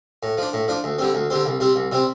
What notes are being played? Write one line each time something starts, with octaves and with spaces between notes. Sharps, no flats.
A2
F3 D4
A2
F3 D4
D2
D3 G3 C4
D2
D3 G3 C4
C2
C3 G3 C4
C2
C3 G3 C4